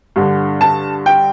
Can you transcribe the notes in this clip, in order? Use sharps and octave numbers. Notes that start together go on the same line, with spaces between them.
G2 D3
A5
G5